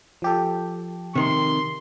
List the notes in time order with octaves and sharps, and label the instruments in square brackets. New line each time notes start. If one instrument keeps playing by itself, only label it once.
[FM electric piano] F3 G4 A4
[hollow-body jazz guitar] C3 D#3 [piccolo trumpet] C6